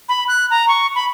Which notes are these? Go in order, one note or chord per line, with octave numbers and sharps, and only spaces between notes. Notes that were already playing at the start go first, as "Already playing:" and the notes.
B5
F#6
A#5
C#6
B5